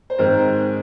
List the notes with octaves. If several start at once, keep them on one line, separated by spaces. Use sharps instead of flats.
C5
G#2 D#3 G#3 C4 A#4